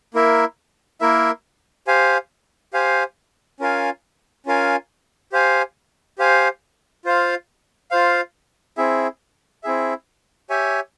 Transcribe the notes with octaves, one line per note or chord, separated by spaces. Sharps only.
A#3 E4 A#4 E5
A#3 E4 A#4 E5
G4 C5 F5 G#5
G4 C5 F5 G#5
C#4 F4 A#4 F5 G#5
C#4 F4 A#4 F5 G#5
G4 C5 F5 G#5
G4 C5 F5 G#5
F4 C5 F5
F4 C5 F5
C4 E4 G#4 E5
C4 E4 G#4 E5
G4 C#5 E5 G#5